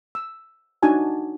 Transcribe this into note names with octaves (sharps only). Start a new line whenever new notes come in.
E6
D4 D#4 F#4 G#5 A5